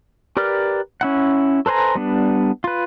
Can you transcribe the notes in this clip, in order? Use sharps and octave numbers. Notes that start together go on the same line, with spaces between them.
G4 A#4 B4 D5 F6
C#4 E4 F#5
A4 B4 C5 G#5 A#5
G3 B3 D4
F4 B4